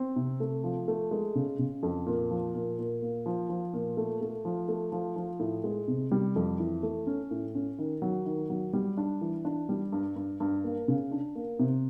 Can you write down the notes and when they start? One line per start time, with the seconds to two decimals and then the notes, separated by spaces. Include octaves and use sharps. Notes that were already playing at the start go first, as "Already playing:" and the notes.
Already playing: C4
0.16 C3
0.40 A3
0.64 F3
0.88 A3
1.11 G#3
1.35 C#3
1.59 C#3
1.83 F2
2.06 A#2
2.31 F3
2.54 A#2
2.78 A#2
3.02 A#3
3.26 F3
3.49 F3
3.74 A#2
3.97 A3
4.21 A3
4.45 F3
4.68 A3
4.92 F3
5.16 F3
5.39 A2
5.64 G#3
5.88 C3
6.11 G3
6.36 F2
6.59 E3
6.83 A3
7.07 C#4
7.31 A2
7.55 C#4
7.78 D#3
8.02 F#3
8.26 D#3
8.50 F#3
8.73 G3
8.97 D4
9.21 E3
9.45 D4
9.69 G3
9.92 G2
10.16 G2
10.40 G2
10.64 A#3
10.88 C#3
11.11 D4
11.35 A#3
11.59 C3